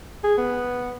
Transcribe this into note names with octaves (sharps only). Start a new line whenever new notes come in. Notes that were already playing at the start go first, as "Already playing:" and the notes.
G#4
B3